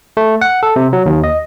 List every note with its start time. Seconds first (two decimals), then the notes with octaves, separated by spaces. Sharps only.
0.17 A3
0.41 F#5
0.63 A4
0.76 C3
0.93 F#3
1.06 D#2
1.24 D#5